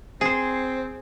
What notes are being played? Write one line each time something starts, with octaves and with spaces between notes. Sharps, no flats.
C4 G#4 C5